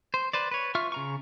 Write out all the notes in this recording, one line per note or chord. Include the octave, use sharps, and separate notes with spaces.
C5
B4 C5 D5
B4 C#5
F4 E5 C#6 F6
C#3 A#5 C#6